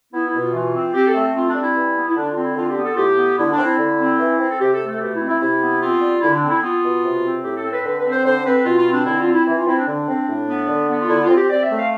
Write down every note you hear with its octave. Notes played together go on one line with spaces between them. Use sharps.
B3 E4
E4
B2
F4
E3 F4
C4
C4 G4
A4
A3
C4 F4
D4
G3
E4
E3
B3
E4
D3 D4
F4
C4
E4
D3 F4
G4
B3
A4
F4
A2 G4
B3
D3 E4
D4
C4
E4
D3
C4
E3
C4
A4
C3 G4
A4
A3
A4
B2 G4
E4
C4
E4
C3 E4
B3
C4 F4
G3
D3 E4
D4
C4
E4
B3 F4
B2
C3
C4
A2 G4
A4
C4
B4
D3 B4
B4
C4
C5
D3 C5
C4 B4
B2 F4
F4
C4
D4
D3 E4
F4
C4
E4
E3 E4
F4
C4 E4
D4
D3 D4
C4
A2
B3
D3
B3
F4
D3 E4
F4
C4
G4
C4 D5
E5
A3
F5